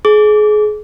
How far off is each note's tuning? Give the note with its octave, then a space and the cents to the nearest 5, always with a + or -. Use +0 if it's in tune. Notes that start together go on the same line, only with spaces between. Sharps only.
G#4 +30 D6 -20